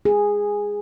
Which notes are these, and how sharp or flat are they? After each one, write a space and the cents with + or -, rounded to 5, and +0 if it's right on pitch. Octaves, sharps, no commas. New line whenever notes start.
G#4 -10